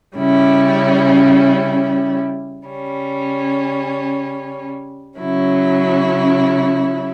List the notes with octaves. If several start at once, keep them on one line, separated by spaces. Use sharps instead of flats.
C#3 G3 C#4 E4
C#3 G3 C#4
C#3 F#3 C#4 E4